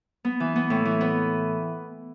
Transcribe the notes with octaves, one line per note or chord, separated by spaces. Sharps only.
B3
E3
B3
A2
E3
B3